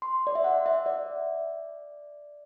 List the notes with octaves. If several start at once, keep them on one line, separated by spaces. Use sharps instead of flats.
C6
D5
E5
F#5
E5
D5